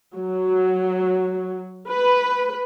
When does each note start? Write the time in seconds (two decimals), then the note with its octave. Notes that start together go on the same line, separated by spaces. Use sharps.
0.15 F#3
1.89 B4